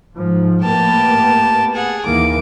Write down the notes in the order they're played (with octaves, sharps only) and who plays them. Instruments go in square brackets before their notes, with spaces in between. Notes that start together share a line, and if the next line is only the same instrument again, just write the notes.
[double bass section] G#2 F3
[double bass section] A2 A#3 B3 [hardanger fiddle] G4 A5
[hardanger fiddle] G#4 F#5
[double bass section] D#2 E3 A#3 [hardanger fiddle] D6